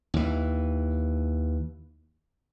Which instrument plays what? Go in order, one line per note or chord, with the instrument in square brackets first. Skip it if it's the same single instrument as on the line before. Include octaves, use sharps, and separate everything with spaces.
[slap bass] D#2 E3